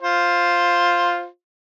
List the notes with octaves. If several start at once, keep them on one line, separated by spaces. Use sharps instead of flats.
F4 C5